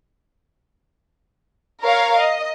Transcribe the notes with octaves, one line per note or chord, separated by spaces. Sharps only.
A#4 C#5 F5
D#5